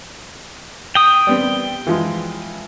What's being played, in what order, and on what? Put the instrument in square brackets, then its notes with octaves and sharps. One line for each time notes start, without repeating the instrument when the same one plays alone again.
[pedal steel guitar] G5 D#6
[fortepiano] G3 B3 C4
E3 F3 G#3